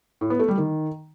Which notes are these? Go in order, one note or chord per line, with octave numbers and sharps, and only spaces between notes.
A2
B3
A3
G3
D#3